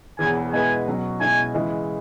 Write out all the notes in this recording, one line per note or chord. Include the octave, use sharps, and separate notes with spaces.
E1 E2 E3 G#5
B2 G#3 E4 B4 G#5
B2 F#3 C#4
B2 G#3 C#4 E4 G#5
C#3 E3 G#3 E4